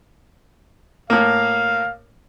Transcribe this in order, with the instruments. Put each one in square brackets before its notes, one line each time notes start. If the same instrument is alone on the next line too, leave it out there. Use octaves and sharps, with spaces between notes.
[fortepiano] A2 A#3 [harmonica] F5